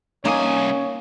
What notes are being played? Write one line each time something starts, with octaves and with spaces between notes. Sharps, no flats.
C2 A#3 C#4 D#4 C#5 G#5 C6 D#6